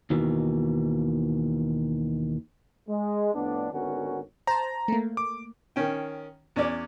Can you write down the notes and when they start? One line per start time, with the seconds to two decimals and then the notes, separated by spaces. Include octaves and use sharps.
0.10 D#2 B2 D#3 E3
2.88 G#3
3.34 F2 A2 B3 D4
3.72 G#1 D3 B3 C#4 F#4 A#4
4.47 C5 A5 A#5
4.88 A3 A#3
5.17 D6
5.76 D#3 C#4 G5
6.56 E2 C#4 C#5 D5 D6